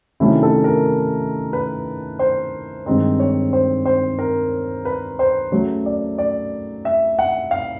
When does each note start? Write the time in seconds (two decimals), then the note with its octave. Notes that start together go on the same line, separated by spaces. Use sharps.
0.20 C3 D#3 F#3 A3 C#4 E4
0.43 A4
0.64 A#4
1.53 B4
2.19 C5
2.86 G2 D#3 G#3 C4 D#4 C5
3.20 C#5
3.53 C5
3.86 C5
4.19 A#4
4.85 B4
5.19 C5
5.52 C#3 F#3 A3 C#5
5.86 D5
6.18 D5
6.85 E5
7.19 F#5
7.51 F5